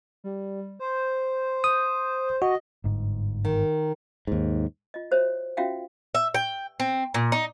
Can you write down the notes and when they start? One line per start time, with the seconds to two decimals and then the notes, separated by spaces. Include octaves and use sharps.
0.24 G3
0.79 C5
1.64 D#6
2.42 F#4 D#5
2.84 G1 G#2
3.45 D#3
4.27 D#2 G#2
4.94 F4 D#5
5.11 F#4 C5 C#5 E5
5.57 C#4 F4 F#4 E5 F5 G5
6.15 E5
6.34 G5
6.80 C4
7.14 A#2
7.32 D#4